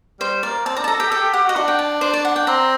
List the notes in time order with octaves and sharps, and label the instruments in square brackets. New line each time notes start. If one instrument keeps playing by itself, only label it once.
[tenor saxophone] G3 [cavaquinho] C5
[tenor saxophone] A#3 [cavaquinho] D5
[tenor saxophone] C4 [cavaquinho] A5
[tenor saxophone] D4 [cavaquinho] A#5
[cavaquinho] A5
[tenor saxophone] A4 [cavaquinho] A#5
[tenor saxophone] G4 [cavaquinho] G5
[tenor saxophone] A4 [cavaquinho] G5
[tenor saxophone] G4
[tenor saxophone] G4 [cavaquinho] F#5
[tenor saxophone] F#4 [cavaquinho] D#5
[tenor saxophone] D4 [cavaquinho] F#5
[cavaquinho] G5
A5
[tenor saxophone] D4 [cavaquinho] C5
[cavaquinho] D5
F#5
G5
[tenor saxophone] C4 [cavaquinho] A#5